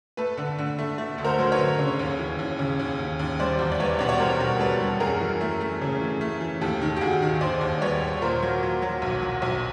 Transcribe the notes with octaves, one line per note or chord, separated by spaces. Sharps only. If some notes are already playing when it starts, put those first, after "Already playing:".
A3 A4 B4
D3
D3
A3
A3
D2
A#4 C5
F#3 C5
B4 C#5
D3
C#3
D#2
E3
D#2
C#3
D#2
D#2
D#2
G3 C5 D5
E2
D5
G3 B4 C#5
B2 D5
C#5
G3 A#4 C5
B2
G3 A4 B4
G3
F#2 G#4 A#4
E3
A3
A3
C#3
E3
A3
E3
D#2 G4 A4
D#3
G4
D#2 F#4 G#4
D#3
D#2 C5 D5
D#2
G3 B4 C#5
D#2
A#2 A#4 C5
F#3
F#3
F#3
B1
F#3
B1